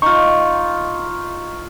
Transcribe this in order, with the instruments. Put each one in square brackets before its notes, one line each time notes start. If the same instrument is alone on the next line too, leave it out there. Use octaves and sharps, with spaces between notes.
[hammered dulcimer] D#4 F4 [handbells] C#6